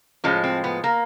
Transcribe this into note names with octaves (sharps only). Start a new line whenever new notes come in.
A2 F3 G#3 C#4
C4
B3
A#3